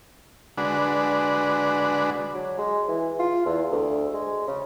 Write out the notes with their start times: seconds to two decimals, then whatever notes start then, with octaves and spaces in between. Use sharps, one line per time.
0.58 D3 G#3 D4 F#4 B4
2.34 F#3
2.58 G#3
2.88 E3
3.19 F4
3.46 E2
3.72 D2
4.13 G#3
4.47 C#3